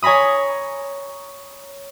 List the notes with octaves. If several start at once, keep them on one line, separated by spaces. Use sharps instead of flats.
C#5 G#5 A#5 B5 D#6